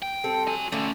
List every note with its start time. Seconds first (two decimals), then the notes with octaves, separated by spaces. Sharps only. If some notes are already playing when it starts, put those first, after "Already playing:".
0.02 G5
0.24 G3 C4 A4
0.48 F#4 G#5
0.72 D3 A3 C#4 G5